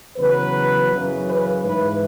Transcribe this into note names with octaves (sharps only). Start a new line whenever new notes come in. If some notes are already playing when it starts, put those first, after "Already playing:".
E2 C#3 F#3 B4
F#2 C#3 E3
B4
G#2 E3 B4